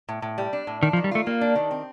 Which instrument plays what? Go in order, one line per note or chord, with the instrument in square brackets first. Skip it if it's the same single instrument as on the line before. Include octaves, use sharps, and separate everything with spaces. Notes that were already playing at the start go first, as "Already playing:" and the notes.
[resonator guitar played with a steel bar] A2
A2
G3
D4
A2
[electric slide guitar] D#3 [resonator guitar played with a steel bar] D4
[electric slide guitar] F3
[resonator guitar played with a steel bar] D#3
[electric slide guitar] G3
[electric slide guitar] A3 [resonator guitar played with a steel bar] F4
[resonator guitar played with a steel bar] G3 [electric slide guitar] A#3
[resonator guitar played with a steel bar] D4
D#3
C4